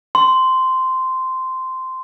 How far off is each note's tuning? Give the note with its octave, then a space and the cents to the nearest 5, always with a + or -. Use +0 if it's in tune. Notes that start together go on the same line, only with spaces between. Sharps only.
C6 -10